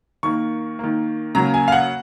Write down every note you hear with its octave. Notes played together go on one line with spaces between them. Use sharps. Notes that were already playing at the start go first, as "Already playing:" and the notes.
D#3 A#3 C#6
D#3 A#3
C#3 F#3 A#3 A#5
G#5
F5
F#5